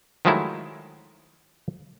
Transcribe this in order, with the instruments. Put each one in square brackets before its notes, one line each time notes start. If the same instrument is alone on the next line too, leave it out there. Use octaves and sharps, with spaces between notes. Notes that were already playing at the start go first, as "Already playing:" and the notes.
[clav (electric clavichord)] D#3 F3 F#3 G#3 A3 E4